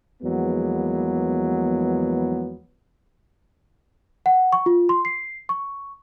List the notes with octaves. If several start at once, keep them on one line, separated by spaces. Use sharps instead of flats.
E2 F3 F#3 G#3 A#3 B3
F#5
C#6
F4
C6
C7
C#6